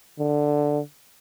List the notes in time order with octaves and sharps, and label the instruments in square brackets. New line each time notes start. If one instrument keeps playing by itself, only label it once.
[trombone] D3